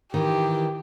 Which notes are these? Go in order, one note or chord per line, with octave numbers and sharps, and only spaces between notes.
D#3 E3 G4